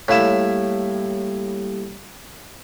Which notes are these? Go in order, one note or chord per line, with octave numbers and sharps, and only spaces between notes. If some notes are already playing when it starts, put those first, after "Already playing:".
A2 G3 A#3 E4 G4 C#5 F5 E7